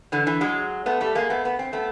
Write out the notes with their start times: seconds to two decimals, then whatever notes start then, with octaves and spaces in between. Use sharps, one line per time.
0.12 D3 E3
0.26 D3 E3
0.41 F#3 G#3
0.86 A3 B3
1.01 G3 A3
1.15 G#3 A#3
1.30 A3 B3
1.45 B3
1.59 C4
1.73 A3 B3